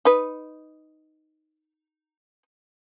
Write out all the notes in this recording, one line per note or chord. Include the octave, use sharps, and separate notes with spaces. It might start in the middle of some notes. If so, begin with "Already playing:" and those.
D#4 B4